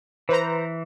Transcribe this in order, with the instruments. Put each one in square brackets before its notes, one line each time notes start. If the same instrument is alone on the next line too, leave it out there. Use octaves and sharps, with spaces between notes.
[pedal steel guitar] E3 [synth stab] B4 C5 A#5